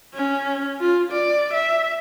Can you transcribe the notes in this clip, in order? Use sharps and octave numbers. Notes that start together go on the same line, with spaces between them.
C#4
F4
D5
E5